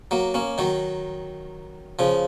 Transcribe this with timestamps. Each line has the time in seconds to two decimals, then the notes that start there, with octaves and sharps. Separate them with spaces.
0.11 F#3 A#3
0.34 A#3 C#4
0.58 D#3 F#3
1.99 C#3 F3